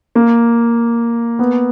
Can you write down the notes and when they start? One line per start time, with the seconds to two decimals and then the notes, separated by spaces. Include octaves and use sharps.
0.15 A#3
1.39 B3